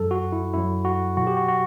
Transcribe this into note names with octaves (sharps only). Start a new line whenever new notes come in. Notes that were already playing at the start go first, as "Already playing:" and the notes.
Already playing: F#2 F#3 A4
F#4
E4
F#2 F#3 E4
F#4
B2 F#3 F#4
G4
F#4
F#4